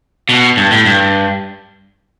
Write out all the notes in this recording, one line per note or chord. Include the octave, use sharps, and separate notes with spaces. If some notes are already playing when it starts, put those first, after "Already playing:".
B2
G2
A2
G2